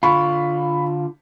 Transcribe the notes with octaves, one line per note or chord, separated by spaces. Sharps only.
D3 F4 B5 C#6